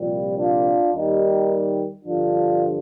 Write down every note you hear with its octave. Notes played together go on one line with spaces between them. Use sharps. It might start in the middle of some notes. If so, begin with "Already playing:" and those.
Already playing: C2 A#2 F3 G3
D4 F4
D#2 D#3 G3 D#4 G4
G2 D3 F3 D4 F4